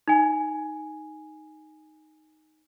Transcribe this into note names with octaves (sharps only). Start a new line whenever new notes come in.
D#4 G#5